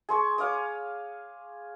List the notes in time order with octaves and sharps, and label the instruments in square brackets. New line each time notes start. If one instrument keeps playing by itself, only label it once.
[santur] G#4 C6 C#6
C#5 F5 D6 D#6